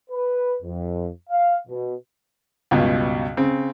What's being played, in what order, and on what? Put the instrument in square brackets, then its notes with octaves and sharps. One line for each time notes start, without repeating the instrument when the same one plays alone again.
[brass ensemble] B4
F2
F5
B2
[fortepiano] C#2 G2 B2
C#3 C4